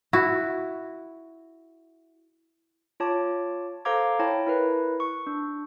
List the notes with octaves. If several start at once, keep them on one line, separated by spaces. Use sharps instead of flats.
E4 F#4
F4 C#5 A5 D6
A4 C5 F5 A#5 D6 G#6
E4 C#5 G5 A5
E4 A#4 B4
C#6
D4